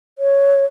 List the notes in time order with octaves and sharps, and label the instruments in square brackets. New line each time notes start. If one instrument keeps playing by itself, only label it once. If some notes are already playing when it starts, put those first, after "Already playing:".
[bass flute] C#5